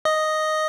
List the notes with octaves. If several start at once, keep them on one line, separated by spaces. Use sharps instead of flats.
D#5